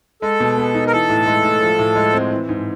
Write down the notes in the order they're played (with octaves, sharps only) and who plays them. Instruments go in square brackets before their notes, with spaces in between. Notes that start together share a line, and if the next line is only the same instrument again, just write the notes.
[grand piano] G#3 [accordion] A4
[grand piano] B2
B3
D#4
[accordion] A#4
[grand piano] E3 [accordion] A4
[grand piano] A2
G#3
A2
F3
A2
G#3
C4
E3
G#2